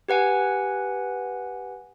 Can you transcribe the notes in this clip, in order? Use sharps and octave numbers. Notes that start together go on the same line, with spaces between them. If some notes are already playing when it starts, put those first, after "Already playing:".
G4 B4 F#5 G#5